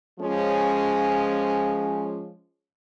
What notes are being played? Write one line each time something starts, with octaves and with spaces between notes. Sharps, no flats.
F3 G#3 C#4